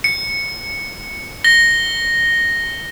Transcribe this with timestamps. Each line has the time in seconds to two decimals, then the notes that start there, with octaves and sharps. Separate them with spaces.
0.04 C#7
1.44 A#6 G7